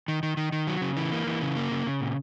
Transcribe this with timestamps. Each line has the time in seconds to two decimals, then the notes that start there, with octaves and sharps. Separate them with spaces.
0.08 D#3
0.23 D#3
0.37 D#3
0.52 D#3
0.67 F#3
0.82 C#3
0.97 E3
1.12 A#3
1.27 E3
1.42 C#3
1.57 A#3
1.71 C#3
1.87 C#3
2.01 A#2